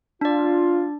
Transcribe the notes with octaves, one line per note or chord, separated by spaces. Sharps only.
D4 F4 D5